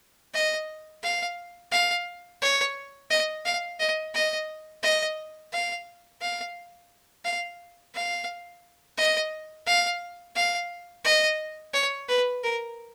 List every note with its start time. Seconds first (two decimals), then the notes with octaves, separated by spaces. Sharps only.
0.34 D#5
1.04 F5
1.72 F5
2.42 C#5
3.11 D#5
3.45 F5
3.80 D#5
4.14 D#5
4.83 D#5
5.52 F5
6.21 F5
7.25 F5
7.94 F5
8.98 D#5
9.67 F5
10.36 F5
11.05 D#5
11.74 C#5
12.09 B4
12.43 A#4